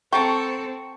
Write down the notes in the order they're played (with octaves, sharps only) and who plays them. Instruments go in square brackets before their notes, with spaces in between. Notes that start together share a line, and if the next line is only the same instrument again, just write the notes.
[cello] C4 A4 [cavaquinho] G5 A5 A#5 [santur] C#6